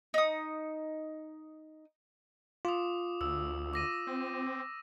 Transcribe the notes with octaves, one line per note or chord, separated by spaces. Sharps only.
D#4 D#6
F4 D6 D#6
D2 E6
D6 A#6 D#7
C4